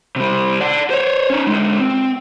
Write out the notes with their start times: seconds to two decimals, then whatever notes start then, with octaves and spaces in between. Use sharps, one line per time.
0.16 C3 G3
0.60 D5 F#5
0.90 C5 C#5
1.30 C#4 D#4
1.47 D3 G#3
1.80 C4